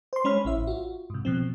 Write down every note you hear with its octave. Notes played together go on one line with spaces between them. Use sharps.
C5 C6
G#3 C#4 C#5 B5 F6
A1 E4 E5
F4 F#4
G#2 C3
B2 F3 C4